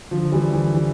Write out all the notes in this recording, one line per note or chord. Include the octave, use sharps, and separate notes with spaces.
D3 F3
E3 G3
E3
E3